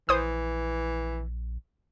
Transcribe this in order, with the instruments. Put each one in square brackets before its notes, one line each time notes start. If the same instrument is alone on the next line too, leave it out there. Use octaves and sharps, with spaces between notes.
[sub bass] A#1 [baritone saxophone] E3 [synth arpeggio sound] C5 D#6